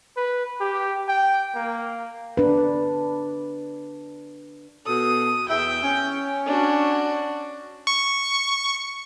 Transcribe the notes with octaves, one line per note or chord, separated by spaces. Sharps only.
B4
G4
G5
A#3
D4 B4
B2 A4 D#6
E2 E5 G5
C#4
D4 F#4
C#6